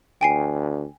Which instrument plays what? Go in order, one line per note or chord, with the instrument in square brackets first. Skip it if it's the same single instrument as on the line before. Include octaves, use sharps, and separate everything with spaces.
[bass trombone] D2 [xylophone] G5 G#5 C7